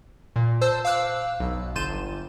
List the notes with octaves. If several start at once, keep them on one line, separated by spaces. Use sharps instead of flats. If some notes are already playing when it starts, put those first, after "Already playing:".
A#2
C5 A5 E6
F5 D6 E6 F#6
B1
G1 C6 G6 A6 D#7 E7
G1